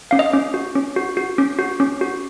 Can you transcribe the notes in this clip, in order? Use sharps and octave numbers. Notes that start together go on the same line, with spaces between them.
C#4 F5
D#5
C#4
F#4
C#4
F#4
F#4
C#4
F#4
C#4
F#4